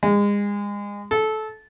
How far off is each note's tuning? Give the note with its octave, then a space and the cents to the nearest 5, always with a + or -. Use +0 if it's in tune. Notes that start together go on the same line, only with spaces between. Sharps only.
G#3 -30
A4 -20